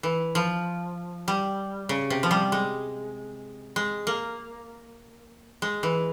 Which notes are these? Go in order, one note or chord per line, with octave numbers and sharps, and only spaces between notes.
E3
F3
G3
C#3
C3
F3
G3
G#3
G#3
A#3
G#3
E3